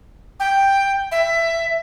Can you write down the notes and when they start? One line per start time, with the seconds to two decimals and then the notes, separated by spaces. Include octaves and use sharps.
0.40 G5
1.11 E5